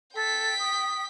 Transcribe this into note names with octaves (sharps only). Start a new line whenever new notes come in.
A4 G5 B6
D#6